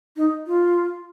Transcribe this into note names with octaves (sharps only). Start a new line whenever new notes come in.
D#4
F4